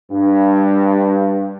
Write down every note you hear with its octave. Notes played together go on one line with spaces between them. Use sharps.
G2